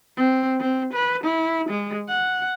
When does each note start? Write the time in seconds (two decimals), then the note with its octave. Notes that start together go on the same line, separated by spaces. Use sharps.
0.17 C4
0.60 C4
0.93 B4
1.24 E4
1.69 G#3
2.09 F#5